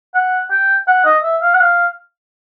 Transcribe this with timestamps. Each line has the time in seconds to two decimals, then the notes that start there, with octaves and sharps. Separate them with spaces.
0.15 F#5
0.50 G5
0.87 F#5
1.05 D#5
1.24 E5
1.42 F5
1.54 F#5
1.60 F5